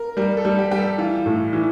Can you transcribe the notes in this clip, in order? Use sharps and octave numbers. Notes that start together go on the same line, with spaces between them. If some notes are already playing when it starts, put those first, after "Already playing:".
Already playing: A#4
G3 A#4
A4
G3
G4
G3 G4
A4
E3 F4
A2
E3